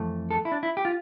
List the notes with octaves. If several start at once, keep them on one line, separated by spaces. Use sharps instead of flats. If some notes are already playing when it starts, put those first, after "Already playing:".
Already playing: F2 E3 A3
A4
E4
D4
E4
G4
F4